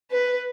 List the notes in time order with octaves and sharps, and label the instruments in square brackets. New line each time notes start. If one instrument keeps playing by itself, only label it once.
[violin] B4